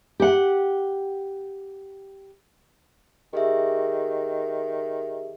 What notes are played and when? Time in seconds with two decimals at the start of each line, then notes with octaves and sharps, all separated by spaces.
0.20 G4 F#5
3.33 D#3 G4 G#4 E5